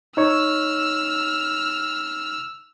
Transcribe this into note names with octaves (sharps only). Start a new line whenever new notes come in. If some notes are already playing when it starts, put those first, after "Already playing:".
D#4 C#5 E6 F6